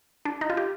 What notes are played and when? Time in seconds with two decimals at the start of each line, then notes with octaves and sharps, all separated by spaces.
0.25 D4
0.41 D#4
0.50 F4
0.57 G4